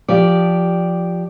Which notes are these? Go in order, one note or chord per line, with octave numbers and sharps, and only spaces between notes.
F3 G4 D5